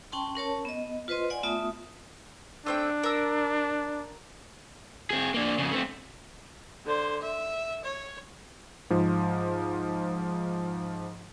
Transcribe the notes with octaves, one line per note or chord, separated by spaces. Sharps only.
C#4 G5 A5 C6
C#4 A#4 C#5 A5
B3 D#5
F4 B4 C5 D#5 C6
D5 F#5 G#5
A3 B3 F4 E5 D#6
A3 C4 D4 G5
A#4 E6
C4 G#4
A#3 D4
F2 C#3
A3 C4
D3 C5
E5
C#5
G#2 F3